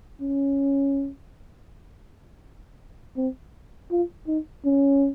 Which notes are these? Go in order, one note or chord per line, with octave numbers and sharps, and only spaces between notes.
C#4
C4
F4
D#4
C#4